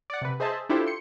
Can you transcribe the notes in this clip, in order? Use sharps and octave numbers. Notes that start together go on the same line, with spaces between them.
D5 F#5
C3 B4
G#4 C5 D#5 E5 A5
D4 E4 F4 G4 A4 C5
C6 C#7